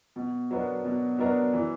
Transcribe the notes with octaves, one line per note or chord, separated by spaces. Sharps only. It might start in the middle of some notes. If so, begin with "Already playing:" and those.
B2
F#3 B3 D4 A#4
B2
F#3 B3 D4 A#4
E3